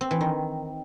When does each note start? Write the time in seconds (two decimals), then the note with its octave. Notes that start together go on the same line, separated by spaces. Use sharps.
0.01 C4
0.11 E3
0.21 D#3